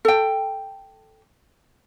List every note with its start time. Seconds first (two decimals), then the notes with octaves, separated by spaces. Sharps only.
0.05 A4 G5